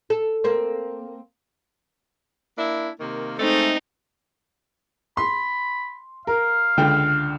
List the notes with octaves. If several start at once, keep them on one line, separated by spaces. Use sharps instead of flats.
A4
A#3 C4
A#3 D4 E4
C3 D#3 A#3
G#3 A3 C4 D#4
B5 C6
A#4 F5
C#2 D3 G5